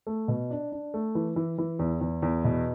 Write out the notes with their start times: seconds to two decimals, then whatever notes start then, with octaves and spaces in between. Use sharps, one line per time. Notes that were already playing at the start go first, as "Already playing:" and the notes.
0.07 A3
0.28 B2
0.51 D4
0.72 D4
0.94 A3
1.15 E3
1.36 E3
1.58 E3
1.79 E2
2.01 E2
2.22 E2
2.44 B2